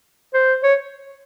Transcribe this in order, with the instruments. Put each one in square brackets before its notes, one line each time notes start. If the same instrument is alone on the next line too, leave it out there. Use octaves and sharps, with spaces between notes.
[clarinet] C5
C#5